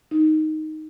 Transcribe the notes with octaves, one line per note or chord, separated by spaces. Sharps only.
D#4